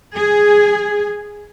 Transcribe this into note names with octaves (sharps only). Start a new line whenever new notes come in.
G#4